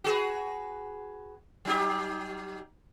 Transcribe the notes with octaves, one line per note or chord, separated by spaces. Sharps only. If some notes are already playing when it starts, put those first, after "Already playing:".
F#4 G#4 B4
F#3 D#4 G4